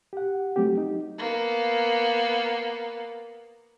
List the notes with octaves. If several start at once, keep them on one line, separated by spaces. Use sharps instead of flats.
G4 F#5
F#3 A3 C4 G4
D#4
A#3 B3